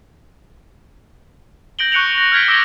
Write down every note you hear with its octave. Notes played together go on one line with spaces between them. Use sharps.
G6 A#6 D7 F#7 G7
C#6 F#6 C#7 D7 F7
A#6
F6 G6 G#6 B6 D7
D6 E6 A#6 D7 G7